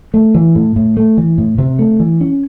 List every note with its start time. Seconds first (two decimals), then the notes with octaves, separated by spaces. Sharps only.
0.14 A3
0.34 E3
0.55 A2
0.76 A2
0.97 A3
1.17 E3
1.38 A2
1.58 C3
1.79 A3
2.00 E3
2.21 C#4